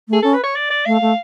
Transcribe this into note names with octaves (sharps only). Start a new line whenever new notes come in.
A3 G#4
C#4 A4
B4
C#5
D5
D5
A3 F5
A3